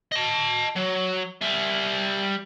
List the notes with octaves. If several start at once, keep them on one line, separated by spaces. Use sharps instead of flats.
D#5 A5
F#3
G3 E5